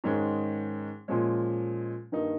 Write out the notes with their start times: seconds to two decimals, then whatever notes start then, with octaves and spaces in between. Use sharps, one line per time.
0.04 G#2 D#3 G#3 C#4
1.08 A#2 F3 G#3 C#4
2.12 G2 D#3 A#3 D#4